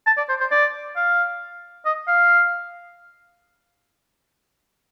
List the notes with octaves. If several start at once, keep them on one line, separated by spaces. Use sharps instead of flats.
A5
D5
C5
C5
D5
F5
D#5
F5